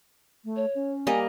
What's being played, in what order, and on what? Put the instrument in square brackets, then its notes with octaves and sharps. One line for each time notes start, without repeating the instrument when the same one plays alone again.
[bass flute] A3
[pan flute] C#5
[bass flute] C#4
[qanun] G3 A#3 D#5 [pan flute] G#5